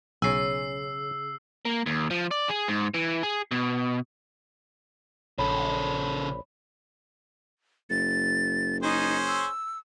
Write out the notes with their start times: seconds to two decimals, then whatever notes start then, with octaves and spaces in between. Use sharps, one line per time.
0.22 B1 C#3 G#5 E6 C7
1.65 A#3
1.86 D#2
2.11 F3
2.31 D5
2.49 G#4
2.68 G#2
2.94 E3
3.23 G#4
3.51 B2
5.38 A#1 C#3 A4 C#5 B5
7.90 F#1 A6
8.83 C#4 D#4 G#4 C5
9.28 E6